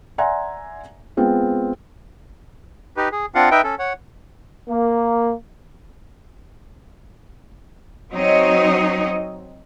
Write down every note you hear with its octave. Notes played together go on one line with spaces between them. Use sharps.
D5 E5 F#5 G#5 A#5 C6
G#3 B3 C4 F4
D#4 G4 B4
G#4
C4 D4 F4 F5 F#5
D#4 B4 E5 G5
C#4 A4
C#5 F#5
A#3
F#3 C4 D#4 C#5 D#5